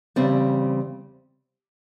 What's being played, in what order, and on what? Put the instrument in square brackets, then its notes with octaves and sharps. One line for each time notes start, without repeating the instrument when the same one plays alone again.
[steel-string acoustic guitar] E2 C#3 G3 C4